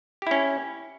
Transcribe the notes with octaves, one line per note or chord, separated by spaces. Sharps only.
C#4 E4 G4